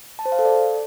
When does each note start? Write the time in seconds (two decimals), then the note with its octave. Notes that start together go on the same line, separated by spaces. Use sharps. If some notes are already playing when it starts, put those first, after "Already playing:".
0.19 A5
0.26 C5
0.32 F5
0.39 A4
0.45 D5